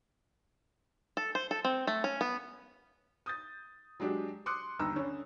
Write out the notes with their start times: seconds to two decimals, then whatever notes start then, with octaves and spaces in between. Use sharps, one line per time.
1.17 A4
1.35 C5
1.51 A4
1.65 C4
1.87 A3
2.04 C#4
2.21 B3
3.26 D#6 G6 A6
4.00 F#3 G#3 D4 G4
4.46 C6 D6 D#6 F#6 C#7
4.79 G1 D#2 A#5 E6
4.96 D3 C#4